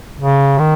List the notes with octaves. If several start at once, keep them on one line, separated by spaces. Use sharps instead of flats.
C#3
D#3